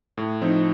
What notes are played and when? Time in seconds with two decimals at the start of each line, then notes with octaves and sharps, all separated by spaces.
0.17 A2
0.42 F3 C4 D#4